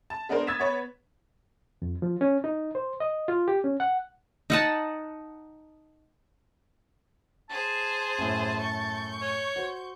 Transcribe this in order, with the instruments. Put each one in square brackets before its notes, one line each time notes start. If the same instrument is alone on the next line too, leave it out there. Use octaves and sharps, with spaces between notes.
[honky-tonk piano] A5
G#3 B3 D4 A#4 C5
D#6 G#6 A6 B6 E7
B3 B4 C#5
[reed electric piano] F2
F3
C#4
D#4
C5
D#5
F4
G4
C#4
F#5
[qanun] D#4 F#5 A5
[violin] G#4 C5 [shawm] A5
[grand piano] F#2 A2
[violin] C#6 G6
[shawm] C#5
[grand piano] F#4 C5